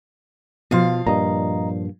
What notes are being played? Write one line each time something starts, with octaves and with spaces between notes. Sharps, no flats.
B2 F3 F4 F5
G2 A#2 D#5 A#5